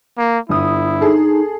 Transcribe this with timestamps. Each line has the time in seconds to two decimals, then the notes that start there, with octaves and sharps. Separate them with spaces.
0.18 A#3
0.49 G1 E4 D#6
1.01 D#4 G#4 A4